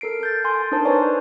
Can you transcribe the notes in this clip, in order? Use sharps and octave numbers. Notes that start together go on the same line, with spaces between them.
A4 A#4 C7 D7
G6 A6
G#5 C6
D4 D#4 A#4 C5 A5
B4 C#5 D5 G#5 A#5 C#6